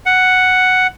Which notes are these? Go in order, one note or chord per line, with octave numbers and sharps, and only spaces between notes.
F#5